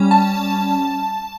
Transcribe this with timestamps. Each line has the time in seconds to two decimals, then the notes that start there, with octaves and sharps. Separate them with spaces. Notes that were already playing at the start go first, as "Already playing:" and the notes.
Already playing: G3 C#4
0.11 A5